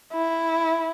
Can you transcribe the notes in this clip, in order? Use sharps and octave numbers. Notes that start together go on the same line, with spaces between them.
E4